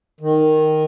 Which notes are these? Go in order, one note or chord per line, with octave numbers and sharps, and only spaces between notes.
D#3